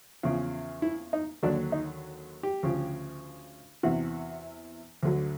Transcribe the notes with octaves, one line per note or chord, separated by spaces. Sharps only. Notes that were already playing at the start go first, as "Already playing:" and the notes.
E2 C#3 F3
E4
D#4
D#2 D3 F#3 D4
D#4
G4
D2 C#3 F3
E2 C3 E3 F#4
D2 D3 F#3